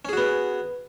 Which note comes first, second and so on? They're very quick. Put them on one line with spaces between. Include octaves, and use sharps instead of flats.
C#4 G#4 F#4 B3